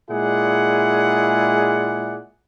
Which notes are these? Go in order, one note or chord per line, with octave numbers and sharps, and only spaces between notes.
A#2 G#3 E4 G#4 D5 F#5